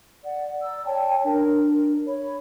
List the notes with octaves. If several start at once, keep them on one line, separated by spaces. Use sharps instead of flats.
D5 F#5
D5 A#5 E6
C#5 G5 A5
D4 A#4
C#5 B5